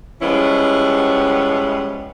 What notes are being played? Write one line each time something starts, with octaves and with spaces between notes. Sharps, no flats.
F3 G3 G#3 B3 C#4 E4